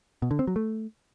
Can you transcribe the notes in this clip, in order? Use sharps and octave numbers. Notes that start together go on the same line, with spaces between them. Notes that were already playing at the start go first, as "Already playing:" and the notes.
B2
D3
C4
F#3
A3